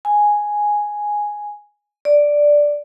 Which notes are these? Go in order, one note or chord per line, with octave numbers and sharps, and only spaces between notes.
G#5
D5